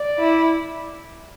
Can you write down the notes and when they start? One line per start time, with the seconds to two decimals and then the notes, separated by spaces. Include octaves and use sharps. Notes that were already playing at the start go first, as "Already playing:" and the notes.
Already playing: D5
0.19 E4